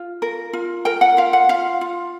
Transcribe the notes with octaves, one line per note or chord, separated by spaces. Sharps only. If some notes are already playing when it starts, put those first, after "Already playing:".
Already playing: F4
A#4
F4
A#4 G5
F#5
F4 F5
F#5
F4 F5
F4